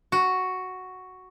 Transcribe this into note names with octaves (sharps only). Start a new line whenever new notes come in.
F#4